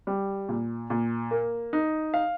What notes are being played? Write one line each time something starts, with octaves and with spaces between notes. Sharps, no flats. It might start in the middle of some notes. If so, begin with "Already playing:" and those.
G3
A#2
A#2
A#3
D#4
F5